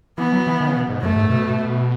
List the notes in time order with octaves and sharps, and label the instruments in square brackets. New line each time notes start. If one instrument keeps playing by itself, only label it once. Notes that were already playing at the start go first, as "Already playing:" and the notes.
[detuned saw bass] E3 [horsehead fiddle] B3
[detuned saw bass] F#3
E3
D#3
C#3
B2
G#2
[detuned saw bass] F#2 [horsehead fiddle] A3
[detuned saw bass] G#2
B2